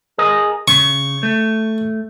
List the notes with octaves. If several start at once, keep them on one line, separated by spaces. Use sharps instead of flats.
G#4 A#4 D#5
C#3 C#6
A3